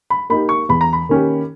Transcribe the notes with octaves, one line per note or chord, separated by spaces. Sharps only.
B5
A#3 D#4 G4 B5
C#6
E2 B5
A#5
B5
D#3 A#3 C#4 G4